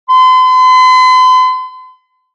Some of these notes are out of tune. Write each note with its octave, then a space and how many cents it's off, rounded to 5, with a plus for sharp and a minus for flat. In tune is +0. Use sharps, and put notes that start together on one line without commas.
C6 -45